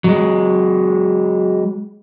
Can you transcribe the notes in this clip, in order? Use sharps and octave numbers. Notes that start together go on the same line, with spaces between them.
F#3 G#3